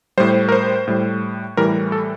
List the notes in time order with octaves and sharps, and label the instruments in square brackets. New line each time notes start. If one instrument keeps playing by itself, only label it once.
[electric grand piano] A2 G3 C5
A#4
C5
A2 G3
A2 E3 G3 A#4
A4